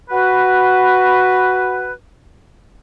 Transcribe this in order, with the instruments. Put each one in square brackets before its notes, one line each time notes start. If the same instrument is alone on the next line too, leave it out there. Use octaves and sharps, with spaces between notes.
[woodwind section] F#4 B4